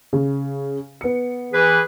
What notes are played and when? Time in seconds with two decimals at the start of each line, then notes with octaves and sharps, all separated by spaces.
0.13 C#3
1.01 B3 C#7
1.53 E3 G#4 B4